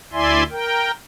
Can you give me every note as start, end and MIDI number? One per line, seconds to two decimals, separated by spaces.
0.13 0.43 38
0.13 0.43 64
0.13 0.43 74
0.13 0.43 76
0.13 0.43 80
0.13 0.43 84
0.51 0.91 70
0.51 0.91 79